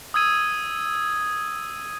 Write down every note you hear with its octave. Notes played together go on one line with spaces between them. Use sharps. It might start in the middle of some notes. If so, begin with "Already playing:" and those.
D#6 E6 G#6 D#7